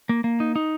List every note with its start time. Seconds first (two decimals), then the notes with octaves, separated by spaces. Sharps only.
0.09 A#3
0.24 A#3
0.40 D#4
0.56 D#4